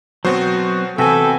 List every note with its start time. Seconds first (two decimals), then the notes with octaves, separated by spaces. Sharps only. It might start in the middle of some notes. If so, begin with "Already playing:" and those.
0.25 B2 F#3 B3 C4 F#4 C5
0.98 C3 E3 B3 F#4 A4 B4 G5 G#5